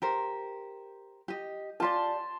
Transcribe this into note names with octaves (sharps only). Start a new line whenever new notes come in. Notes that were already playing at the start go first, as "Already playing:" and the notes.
G4 A#4 C5
G4 D#5
F4 G4 D5 A5 C6